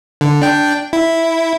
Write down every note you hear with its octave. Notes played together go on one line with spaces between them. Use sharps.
D3
D4 G5
E4